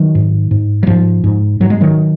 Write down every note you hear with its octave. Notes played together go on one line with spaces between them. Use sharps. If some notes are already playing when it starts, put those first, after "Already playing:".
Already playing: D#3 F#3
G#2
G#2
F#3
G#2 F3
G#2
G#2 F#3
G#3
D#3 F#3